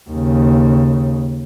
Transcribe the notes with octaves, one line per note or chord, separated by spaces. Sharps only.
D#2 C#3